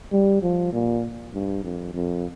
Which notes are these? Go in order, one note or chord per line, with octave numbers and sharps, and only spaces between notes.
G3
F3
A#2
G2
F2
F2